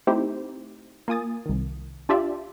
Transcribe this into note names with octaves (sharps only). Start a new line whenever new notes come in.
A3 C4 D#4 E4 G4 C5
A#3 F4 G#5 D#6 A6
C2 D#3
D4 F4 G4 D5 E5